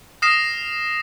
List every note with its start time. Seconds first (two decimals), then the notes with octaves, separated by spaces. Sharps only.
0.22 D#6 F6 A#6 C7 E7